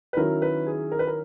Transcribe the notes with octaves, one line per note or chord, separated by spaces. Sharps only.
B4
D#3 F#3 C#4 E4 A#4
B4
G#4
A#4
B4
A#4